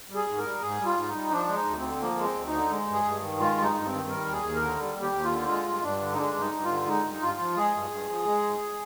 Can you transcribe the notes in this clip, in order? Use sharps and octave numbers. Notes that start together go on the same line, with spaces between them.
G3
G#4
G#2
A#4
G3
G#2 G#4
G3
F4
G#2
D#4
G3
F3 D4
G#3
D#4
D2
C4
D3
F3 A#3
G#3
C4
D2
D#4
D3
G#3
G2
G#4
G2
D#3
G#3 F4
G2
D#4
G2
C4
D#3
G3 A#4
D#2
G#4
D#2
A#4
D3
G3
D#2
G4
D#2
F4
D3
G#3 F4
G2
G2 D4
D3
D#4
G#3 D4
G2
D#4
G2
D3 F4
G#3 D#4
G2
G2 F4
F3
G#3 G#4
G2
G2
F3
G#3
G#2